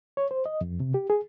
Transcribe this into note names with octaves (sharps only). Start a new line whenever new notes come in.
C#5
C5
D#5
F2
C3
G4
G#4